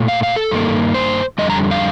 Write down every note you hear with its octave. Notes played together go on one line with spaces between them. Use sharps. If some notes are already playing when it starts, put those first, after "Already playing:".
Already playing: A#2 A3
F5
F5
A4
G2 D#3 A#3
C5
F2 D3 G3 D#5
A#5
F5